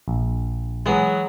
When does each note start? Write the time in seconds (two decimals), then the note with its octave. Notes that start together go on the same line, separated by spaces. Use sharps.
0.08 A#1
0.86 E3 F#3 G#3 B3